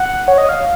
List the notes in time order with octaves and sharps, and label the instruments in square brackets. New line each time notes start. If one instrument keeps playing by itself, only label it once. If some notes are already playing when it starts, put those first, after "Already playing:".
Already playing: [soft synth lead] F#5
C#5
D#5
F5